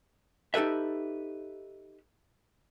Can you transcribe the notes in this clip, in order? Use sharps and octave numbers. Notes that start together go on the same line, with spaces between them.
D#4 G4 A4 B4 E5